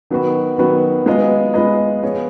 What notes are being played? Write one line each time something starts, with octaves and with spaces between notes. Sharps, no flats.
D#3 F#3 B3 F#4 B4
D#3 F#3 B3 F#4 B4
G#3 B3 F4 B4 D#5
G#3 B3 F4 B4 D#5
F3 B3 F4 G#4 C#5